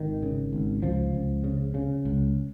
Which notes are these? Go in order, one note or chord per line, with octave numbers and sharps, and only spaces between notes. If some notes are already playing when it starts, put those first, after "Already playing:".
Already playing: G#1 D#3
C#3
G#1
C#2 F3
C#2
C#3
C#3
C#2